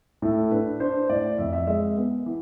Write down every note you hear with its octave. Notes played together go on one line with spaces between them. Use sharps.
A2 A4
D4 B4
D4 C5
A2 D5
F2 E5
E5
G#3 E5
B3
E3